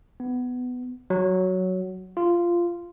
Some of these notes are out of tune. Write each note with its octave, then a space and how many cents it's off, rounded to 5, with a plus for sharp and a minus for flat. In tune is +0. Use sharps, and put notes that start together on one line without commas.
B3 +15
F#3 +5
F4 -10